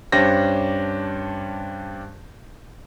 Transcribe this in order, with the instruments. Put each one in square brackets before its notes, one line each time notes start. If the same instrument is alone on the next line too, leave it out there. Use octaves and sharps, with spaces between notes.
[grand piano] G2 C#4 D4 G4 C5 A#6